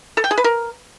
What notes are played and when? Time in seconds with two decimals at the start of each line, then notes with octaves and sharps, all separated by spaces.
0.17 A4
0.24 G5
0.31 G#4
0.38 B4
0.44 A#4